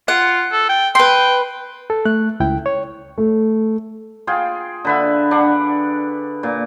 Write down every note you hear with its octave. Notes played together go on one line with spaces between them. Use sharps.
F4 F#5
A4
G5
B4 G5 C6
A4
A3 F#6
C#2 E4 G5
C#5
A3
F4 G#4 G5
D3 B4 E5
D4 F#5
A#2